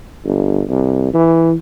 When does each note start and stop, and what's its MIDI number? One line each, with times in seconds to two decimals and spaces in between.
0.25 0.62 31
0.68 1.08 36
1.13 1.54 52